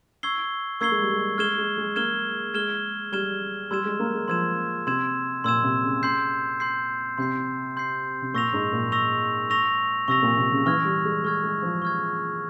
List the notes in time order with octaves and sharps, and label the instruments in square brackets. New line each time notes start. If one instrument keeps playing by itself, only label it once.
[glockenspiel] C#6 E6 G#6 C7 G7
[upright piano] A#3 [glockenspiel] C#6 E6 G#6 C7 G7
[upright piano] G#3
G3
G#3
[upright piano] G#3 [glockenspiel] F6 G#6 E7 G7
[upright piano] G#3
G#3
[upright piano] A#3 [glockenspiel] F6 G#6 E7 G7
[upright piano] G#3 [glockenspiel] F6 G#6 E7 G7
[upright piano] G3 [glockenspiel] F6 G#6 E7 G7
[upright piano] G3 [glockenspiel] C6 E6 G#6 E7
[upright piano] G#3
A#3
G#3
[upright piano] F3 [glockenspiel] C6 E6 G#6 E7
[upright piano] C3 [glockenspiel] C6 E6 G#6 E7
[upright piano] A#2 [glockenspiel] C6 E6 G#6 E7
[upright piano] C3
C#3
[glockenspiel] C6 G6 C7
C6 G6 C7
[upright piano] C3 [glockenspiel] C6 G6 C7
[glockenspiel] C6 G6 C7
[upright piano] C3
[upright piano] A#2 [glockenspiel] C#6 E6 A#6 F7
[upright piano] G#2
A#2
[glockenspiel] C#6 E6 A#6 F7
C#6 E6 A#6 F7
[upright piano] C3 [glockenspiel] C#6 E6 A#6 F7
[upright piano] A#2
C3
C#3
[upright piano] E3 [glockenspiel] C#6 F6 G#6
[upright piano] G3
G#3
[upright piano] G#3 [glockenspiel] C#6 F6 G#6
[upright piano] G#3
F3
[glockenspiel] C#6 F6 G#6